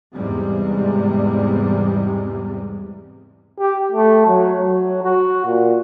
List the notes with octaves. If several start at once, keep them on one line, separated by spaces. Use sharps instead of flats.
E2 G#2 C3 G3 G#3
G4
A3
F#3
F#3
F#4
A#2